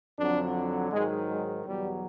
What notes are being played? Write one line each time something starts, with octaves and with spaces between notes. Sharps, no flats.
F2 D3 F#3 D4
G#2 D#3 F#3 G#3
G#3
E2 B2 F#3 G3